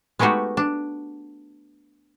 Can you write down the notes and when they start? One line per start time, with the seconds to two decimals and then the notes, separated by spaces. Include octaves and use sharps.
0.19 G#3 A3 B3 D#4 F#4 G4
0.57 D4